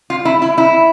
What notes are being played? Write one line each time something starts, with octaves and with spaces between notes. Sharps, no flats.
F4
E4
E4
E4